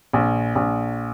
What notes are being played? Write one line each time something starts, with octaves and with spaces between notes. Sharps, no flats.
A#1
A#1